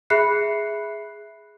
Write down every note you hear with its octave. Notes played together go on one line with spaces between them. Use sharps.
G#4 E5 B5 F#6 C7 C#7